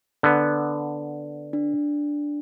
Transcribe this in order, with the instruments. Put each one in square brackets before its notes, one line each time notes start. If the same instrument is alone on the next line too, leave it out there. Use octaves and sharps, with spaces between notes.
[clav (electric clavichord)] D3 B3
[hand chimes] D4